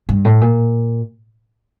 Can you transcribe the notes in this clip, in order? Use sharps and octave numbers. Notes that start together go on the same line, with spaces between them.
G2
A2
A#2